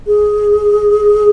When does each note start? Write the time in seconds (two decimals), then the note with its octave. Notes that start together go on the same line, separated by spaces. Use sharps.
0.07 G#4